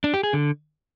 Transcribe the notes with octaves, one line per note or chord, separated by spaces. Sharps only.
D4
G4
G#4
D3